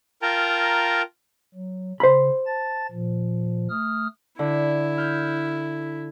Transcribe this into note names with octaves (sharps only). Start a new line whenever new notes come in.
F4 A#4 G5 A5 A#5
F#3
C#3 C5 B5
A5 A6
A#2 F3
A3 D#6 F6
D3 E4
F6 G6